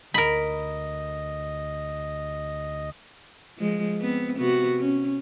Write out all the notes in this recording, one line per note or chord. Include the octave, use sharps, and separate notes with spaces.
D2 A#4 D#5 B5
F3 G#3
B3 C4
C3 B3 F#4
C#4